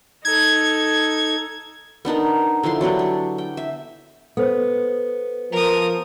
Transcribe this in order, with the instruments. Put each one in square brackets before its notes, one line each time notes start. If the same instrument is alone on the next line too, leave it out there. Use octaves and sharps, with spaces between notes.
[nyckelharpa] D#4 A4 [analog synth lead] G#6
[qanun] B3 D4 D#4 A#4
D3 F3 E4 C6
F#3 B3 D4 G4
D4
G5
E5
[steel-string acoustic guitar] B3 [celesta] A4 C5
[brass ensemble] F3 [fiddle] A#4 D#6